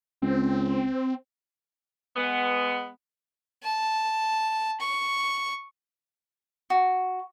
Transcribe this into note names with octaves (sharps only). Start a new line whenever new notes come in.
C#2 C4
G#3 B3
A5
C#6
F#4